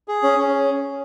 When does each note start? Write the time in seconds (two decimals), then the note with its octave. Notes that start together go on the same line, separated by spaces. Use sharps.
0.08 G#4
0.23 C#4
0.38 C#4